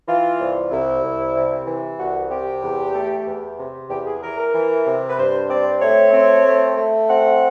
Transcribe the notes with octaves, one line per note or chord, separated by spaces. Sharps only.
E3 F4
C2
C2 E4
C2
C3
E3
C2 F#4
C3 G4
E2
A3
E2
C3
E2 G4
G#4
E3 A#4
A#4
E3
C3
B4
G2 C5
C4 D5
A3 C#5
C4
A3
A3
C4 F#5